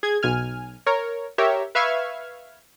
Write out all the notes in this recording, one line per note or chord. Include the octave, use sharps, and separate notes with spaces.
G#4 G#6
B1 G#5 F6
A#4 C#5
G4 A#4 C#5 E5
B4 E5 F5 C#6 F6 G#6